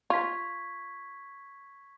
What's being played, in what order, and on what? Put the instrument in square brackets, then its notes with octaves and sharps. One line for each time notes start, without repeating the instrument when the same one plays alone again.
[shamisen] F4 [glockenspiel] C#6 G#6 B6